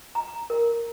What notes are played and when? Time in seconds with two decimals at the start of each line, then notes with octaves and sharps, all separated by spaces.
0.15 A#5
0.50 A#4